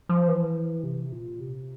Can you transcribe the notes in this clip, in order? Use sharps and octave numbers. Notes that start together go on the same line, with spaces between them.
F3
E3
C3
A#2
C3